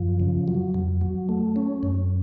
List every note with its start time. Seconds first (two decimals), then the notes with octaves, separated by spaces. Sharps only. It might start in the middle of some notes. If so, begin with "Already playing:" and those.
Already playing: F#2 F3
0.20 C#3
0.48 F#3
0.74 F2
1.01 F#3
1.29 A3
1.56 C#4
1.83 F#2